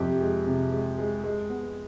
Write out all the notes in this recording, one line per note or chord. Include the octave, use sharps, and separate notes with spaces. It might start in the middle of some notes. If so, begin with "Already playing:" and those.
Already playing: F2 C3 G4
G#3
C3
G#3
G#3
G#3
B3